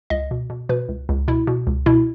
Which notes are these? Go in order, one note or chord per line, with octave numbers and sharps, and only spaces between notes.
C#2 D#5
B2
B2
B2 B4
C#2
C#2
B2 E4
B2
C#2
B2 E4